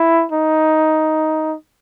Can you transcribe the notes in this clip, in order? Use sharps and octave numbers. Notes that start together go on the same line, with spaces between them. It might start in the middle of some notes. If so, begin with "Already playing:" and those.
Already playing: E4
D#4